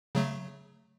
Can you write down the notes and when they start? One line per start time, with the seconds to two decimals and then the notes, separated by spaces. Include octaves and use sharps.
0.15 C#3 F#3 A3